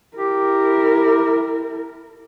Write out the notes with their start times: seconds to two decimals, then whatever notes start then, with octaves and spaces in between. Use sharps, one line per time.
0.17 E4 G4 A#4